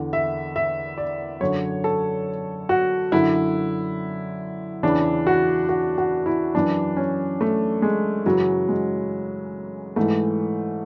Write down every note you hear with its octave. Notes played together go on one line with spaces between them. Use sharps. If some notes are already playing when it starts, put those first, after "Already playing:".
Already playing: E2 D3
E5
E5
D5
F#2 D3 C#5
A4
F#4
F#2 D3 E4
E2 C#3 E3 D4
F#4
F#4
F#4
E4
F#2 E3 D4
C#4
A3
G#3
F#2 C#3 E3 F#3
G#3
G#2 E3 A3